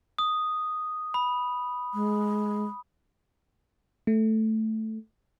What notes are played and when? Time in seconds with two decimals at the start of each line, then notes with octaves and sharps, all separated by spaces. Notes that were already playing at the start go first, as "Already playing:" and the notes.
0.19 D#6
1.14 B5
1.94 G#3
4.07 A3